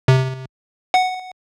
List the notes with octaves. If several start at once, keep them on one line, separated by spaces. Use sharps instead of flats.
C3
F#5